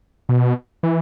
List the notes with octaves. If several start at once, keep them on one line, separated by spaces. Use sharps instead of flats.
B2
E3